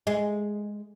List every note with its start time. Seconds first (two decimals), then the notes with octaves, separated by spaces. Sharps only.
0.07 G#3